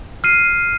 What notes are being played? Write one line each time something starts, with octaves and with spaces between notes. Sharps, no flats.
F6 C7 D#7